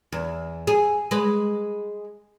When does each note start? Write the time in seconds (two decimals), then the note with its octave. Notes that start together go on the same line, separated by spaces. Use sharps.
0.12 E2
0.67 G#4
1.11 G#3 B4